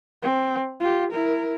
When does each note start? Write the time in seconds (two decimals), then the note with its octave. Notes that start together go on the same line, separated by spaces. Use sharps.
0.22 C4
0.80 F4 G4
1.11 E4 A#4